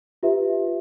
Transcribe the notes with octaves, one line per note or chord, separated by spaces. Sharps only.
F4 G4 B4 E5